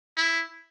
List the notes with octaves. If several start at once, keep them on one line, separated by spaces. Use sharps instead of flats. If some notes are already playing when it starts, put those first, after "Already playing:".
E4